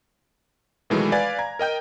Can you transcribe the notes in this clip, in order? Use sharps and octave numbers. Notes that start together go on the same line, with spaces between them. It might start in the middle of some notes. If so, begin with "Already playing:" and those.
B2 D#3 E3 F#3 G#3 A3
B4 D5 F5 G#5 G#6 A6
A#5 G#6
A#4 D#5 G5 G6